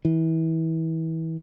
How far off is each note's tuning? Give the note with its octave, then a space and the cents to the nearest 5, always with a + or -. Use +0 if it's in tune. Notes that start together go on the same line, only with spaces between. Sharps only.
E3 -30